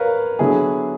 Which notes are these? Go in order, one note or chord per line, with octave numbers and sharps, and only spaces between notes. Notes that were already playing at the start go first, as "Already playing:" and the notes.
Already playing: A#4 B4 C#5 F5
D3 F#3 B3 E4 G#4